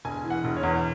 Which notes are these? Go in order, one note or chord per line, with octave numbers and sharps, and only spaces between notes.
E1 G#5
E3
F#5
E1
C#5
E2